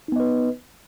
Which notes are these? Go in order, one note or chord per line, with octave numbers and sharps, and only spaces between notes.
B3 D#4 B4 D#5